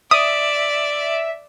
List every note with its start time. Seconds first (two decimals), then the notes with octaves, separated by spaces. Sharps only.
0.11 D5 E5 D#6